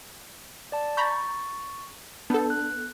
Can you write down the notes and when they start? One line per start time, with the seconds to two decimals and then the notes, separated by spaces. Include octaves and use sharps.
0.72 D5 A5
0.97 A#5 B5 C#6 G6 A6
2.30 B3 D4 A4
2.50 F#6